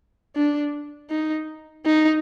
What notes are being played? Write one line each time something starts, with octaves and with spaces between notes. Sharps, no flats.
D4
D#4
D#4